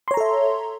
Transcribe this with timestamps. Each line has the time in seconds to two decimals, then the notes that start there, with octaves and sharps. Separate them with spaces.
0.08 C6
0.11 C#5
0.14 A#5
0.17 A4
0.21 E5